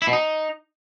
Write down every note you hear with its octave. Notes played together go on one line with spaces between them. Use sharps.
E4
B2
D#4